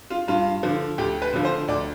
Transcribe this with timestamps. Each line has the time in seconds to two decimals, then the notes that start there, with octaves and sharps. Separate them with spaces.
0.10 F4
0.28 G2 F4
0.63 D3 F3
0.98 D2 G4
1.22 B4
1.33 D3 F3
1.45 C5
1.68 D2 D5